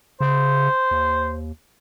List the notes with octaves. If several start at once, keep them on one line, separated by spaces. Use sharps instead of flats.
C#3 C5
D#2